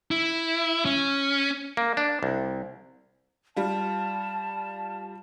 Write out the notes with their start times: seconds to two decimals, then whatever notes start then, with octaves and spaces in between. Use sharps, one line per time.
0.11 E4
0.85 C#4
1.77 A#3
1.97 D4
2.23 C2
3.56 G3 F4 A5